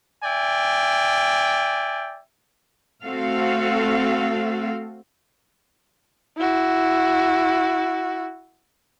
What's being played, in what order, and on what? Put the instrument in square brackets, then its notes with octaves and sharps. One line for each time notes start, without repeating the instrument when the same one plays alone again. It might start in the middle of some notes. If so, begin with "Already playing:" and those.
[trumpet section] D5 E5 G5 G#5
[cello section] A3 C4 F#4 A4 F5
[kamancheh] E4 F#4